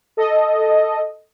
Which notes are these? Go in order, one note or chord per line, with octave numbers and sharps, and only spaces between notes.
A4 D#5